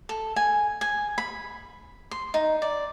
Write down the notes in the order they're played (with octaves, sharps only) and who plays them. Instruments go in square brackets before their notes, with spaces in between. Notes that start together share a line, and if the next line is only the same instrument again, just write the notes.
[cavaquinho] A4
G#5
G#5
B5
C6
D#4
D5